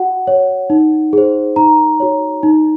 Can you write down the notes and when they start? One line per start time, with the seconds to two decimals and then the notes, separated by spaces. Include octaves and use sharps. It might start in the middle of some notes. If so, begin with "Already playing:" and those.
Already playing: F#4 F#5
0.27 C#5
0.70 D#4
1.13 G#4 C5
1.56 D#4 A#5
2.00 F#4 C#5
2.43 D#4